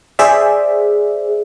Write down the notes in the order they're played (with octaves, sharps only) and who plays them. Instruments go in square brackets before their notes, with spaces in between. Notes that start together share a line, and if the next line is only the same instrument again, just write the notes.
[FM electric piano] G#4 C5 D5 E5